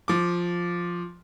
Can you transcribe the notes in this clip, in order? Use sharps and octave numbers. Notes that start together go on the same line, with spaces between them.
F3 D6